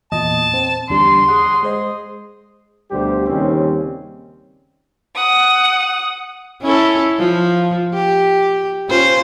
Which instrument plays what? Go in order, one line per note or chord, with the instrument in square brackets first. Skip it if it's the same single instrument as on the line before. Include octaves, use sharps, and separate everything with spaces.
[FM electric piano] E2 A#2 D#5 [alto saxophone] A5
[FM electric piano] C4
[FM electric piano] E2 D3 G3 [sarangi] C6
[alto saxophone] G#4 [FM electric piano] F#5
[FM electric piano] G#3 C5 D#5 [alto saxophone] G#4
[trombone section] D2 B2 G3 G4 C5
D#2 C#3 G3 C4 C#4
[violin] F#5 D#6
[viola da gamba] C#4 E4 A4
F3
G4
C#4 F4 C5